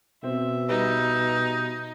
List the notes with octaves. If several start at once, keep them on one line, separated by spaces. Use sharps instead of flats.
B2 C4 E5
G3 D#4 B4